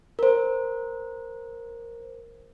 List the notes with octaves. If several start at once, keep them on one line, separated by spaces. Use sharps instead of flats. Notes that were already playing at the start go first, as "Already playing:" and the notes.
A#4 C5